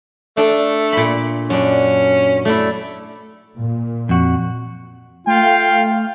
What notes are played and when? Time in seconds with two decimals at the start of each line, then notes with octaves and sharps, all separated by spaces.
0.37 A3 D4 A4
0.92 A#2 B5
1.50 F#2 C#4 D4
2.45 A3 D4 E4
3.59 A#2
4.09 F2 F#4
5.27 A3 F4 F5 G5